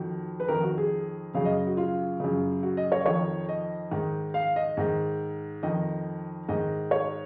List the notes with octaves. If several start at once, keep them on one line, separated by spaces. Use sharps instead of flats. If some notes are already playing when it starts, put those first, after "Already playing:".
Already playing: F2 D#3 F#4
B4
F2 D#3 A#4
F#4
G#4
F#2 C#3 F5
D#5
F#4
F4
F#2 C#3
F#4
D#5
C#5
F2 D#3 C#5
D#5
G#2 D#3
F5
D#5
G#2 D#3
F2 D#3 D#5
G#2 D#3 D#5
C#5